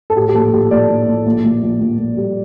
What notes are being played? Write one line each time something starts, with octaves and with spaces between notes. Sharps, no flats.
A4
A2 G4
G4
A#1 A4
A#1 G4
A#1 D5
A#1
A#1
A#1
A#1
A#1
A#1
A#1
G3